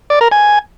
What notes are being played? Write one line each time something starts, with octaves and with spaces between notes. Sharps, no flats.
D5
A#4
G#5